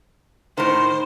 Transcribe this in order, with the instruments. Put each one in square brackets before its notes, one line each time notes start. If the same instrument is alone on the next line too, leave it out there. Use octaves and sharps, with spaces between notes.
[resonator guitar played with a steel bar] A2 D#3 [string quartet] C5